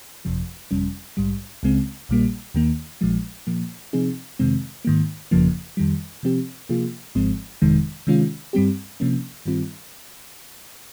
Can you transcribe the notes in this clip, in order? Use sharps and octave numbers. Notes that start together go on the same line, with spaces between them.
G1 F2 C3 F3
G1 F2 C3 G3 C#4
A#1 G#2 G3
C#2 C#3 G#3 C4
A#1 A#2 G3 A#3
D#2 D#3 A#3
A#1 A#2 F3 G#3
A#2 F3 A#3
C3 F3 C4 D#4 G#4
F2 C3 D#3 G#3 C4
G#2 D#3 A#3
G1 F2 C#3 F3 A#3
F2 D#3 G3
C3 F3 C4 G4
C3 F3 A#3 F4 G#4
G#1 G#2 F3 G#3 C4
G1 F2 C3 D#3 G#3
C3 D#3 G#3 C#4 F4
G2 G3 C4 G4
C3 F3 A#3 C#4
G2 D#3 G3 C4 F4